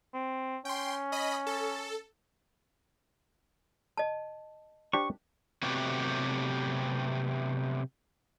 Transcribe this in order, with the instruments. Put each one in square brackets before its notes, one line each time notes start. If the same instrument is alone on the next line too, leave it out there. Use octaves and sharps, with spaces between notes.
[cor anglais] C4
[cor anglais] C#4 [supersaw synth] G5 C6
[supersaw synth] D#5 B5
A4
[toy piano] D#5 A5
[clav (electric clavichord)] D4 G4 C5 [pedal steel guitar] C#6
[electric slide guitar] C3 F#3 A3 B3 F#4 G4